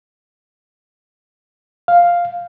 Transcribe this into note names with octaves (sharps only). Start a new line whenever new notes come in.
F5